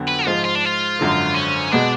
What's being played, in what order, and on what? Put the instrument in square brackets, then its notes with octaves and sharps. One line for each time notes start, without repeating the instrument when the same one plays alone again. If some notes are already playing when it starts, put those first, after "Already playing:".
Already playing: [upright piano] F2 D3 F#3 B3 F#4
[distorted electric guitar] B4
[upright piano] G#2 F3 G#3 [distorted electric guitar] F4
[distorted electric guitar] F4
D4
F4
[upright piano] G#1 F#2 D3 F3
[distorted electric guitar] C#4
[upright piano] B2 G#3 B3 [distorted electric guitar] D4